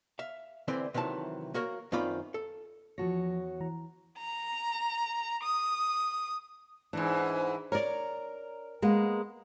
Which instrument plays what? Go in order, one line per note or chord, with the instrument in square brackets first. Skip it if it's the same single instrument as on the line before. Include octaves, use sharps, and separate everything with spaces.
[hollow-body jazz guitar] E5 F5
D3 E3 A3 C4 D5
C3 D#3 E3 F#3 A5
A#3 F#4 A#4 C#5
F#2 D#3 C4 F4 D5 B5
A4
[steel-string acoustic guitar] E2 F#4 C#5 [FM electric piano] F3 A5 A#6
[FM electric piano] E3 A#5
[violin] A#5
D#6
[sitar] G#2 E3 [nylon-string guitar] D4
[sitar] A#4 [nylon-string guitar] C#5 D5
[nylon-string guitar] G#3 A#3 B3